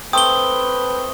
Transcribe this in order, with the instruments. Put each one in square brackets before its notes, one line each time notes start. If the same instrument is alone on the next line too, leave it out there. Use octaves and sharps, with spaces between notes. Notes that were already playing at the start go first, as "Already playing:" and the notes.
[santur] A3 C4 [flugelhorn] B4 [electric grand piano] G5 [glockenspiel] D#6 G7